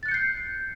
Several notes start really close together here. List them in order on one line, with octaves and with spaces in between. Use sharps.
A6 F#6 C#7 G6 C7